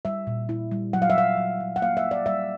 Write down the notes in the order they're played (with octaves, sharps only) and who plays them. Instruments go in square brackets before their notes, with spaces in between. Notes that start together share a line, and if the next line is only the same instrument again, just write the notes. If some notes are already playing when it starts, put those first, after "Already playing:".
[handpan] G3 E5
A#2
E4
G3
F#3 F#5
F5
E5
F#3 F5
F#3
F#3
F#5
A#3 F5
E5
A#3
D5
G3 E5